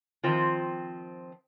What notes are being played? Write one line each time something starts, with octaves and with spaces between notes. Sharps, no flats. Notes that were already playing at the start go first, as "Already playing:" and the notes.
D#3 F3 C4 F4